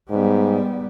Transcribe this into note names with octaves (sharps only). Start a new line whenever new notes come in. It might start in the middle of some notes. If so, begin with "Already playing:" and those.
G#2 G3 B3